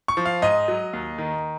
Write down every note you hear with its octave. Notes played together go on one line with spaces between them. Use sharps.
C#6
F3
F5
G#2 D#5
F#3
D#2
D#3